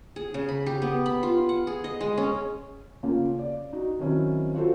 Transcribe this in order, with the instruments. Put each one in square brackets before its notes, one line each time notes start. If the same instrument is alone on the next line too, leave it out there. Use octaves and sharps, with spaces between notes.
[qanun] G#4
C#3
B5
G4
B3
B5
F4
F#5
G#4
D#5
G#3
C#4
[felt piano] C#3 A#3 C#4 F4
D5
D#4 F#4
D#3 F#3 C4 C#4 E4
F4 F#4 A4 C5